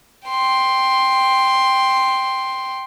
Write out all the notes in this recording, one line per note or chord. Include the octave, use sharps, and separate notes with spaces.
G5 C6